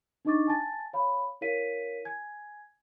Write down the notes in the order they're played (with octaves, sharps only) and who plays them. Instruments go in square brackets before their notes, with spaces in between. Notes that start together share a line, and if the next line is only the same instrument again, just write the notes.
[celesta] D4 D#4 D#5 C#6 D6 A6
G#5 A5 A6
C#5 F5 B5
E4 A#4 C#5 F5 B6 D#7
G#5 G#6